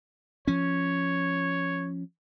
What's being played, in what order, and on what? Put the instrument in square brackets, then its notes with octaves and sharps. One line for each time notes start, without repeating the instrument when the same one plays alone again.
[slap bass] F3 C#4 [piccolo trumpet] C#5